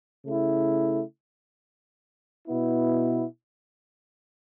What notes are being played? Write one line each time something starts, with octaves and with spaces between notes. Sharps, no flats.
C#3 A3 E4
B2 B3 E4